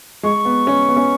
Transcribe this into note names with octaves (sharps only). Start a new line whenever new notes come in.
G#3 C#6
B3
C#4
B3
C#4